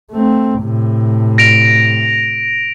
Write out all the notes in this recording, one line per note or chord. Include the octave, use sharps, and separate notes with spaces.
A3 C4
A2 C3
A#6 D7 F7